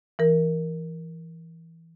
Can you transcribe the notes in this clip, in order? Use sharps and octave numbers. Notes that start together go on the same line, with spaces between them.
E3 A#4